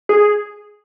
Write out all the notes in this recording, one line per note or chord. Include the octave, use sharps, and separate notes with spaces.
G#4